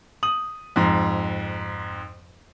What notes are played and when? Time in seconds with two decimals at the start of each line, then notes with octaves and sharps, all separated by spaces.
0.23 D#6 F#7
0.76 F2 G#2